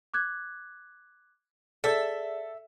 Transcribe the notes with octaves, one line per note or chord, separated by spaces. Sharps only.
D6 F#6 G#6
G#4 A4 D5 E5